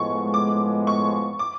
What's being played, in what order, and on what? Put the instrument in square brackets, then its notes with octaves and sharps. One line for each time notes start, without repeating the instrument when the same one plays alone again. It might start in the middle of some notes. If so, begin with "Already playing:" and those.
Already playing: [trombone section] A2 F3 G#3 B3 [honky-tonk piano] C#6
[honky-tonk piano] D6
C#6
D6